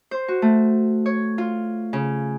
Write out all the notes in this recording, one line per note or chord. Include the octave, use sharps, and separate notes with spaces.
C5
F#4
A3
C#5
F4
C#3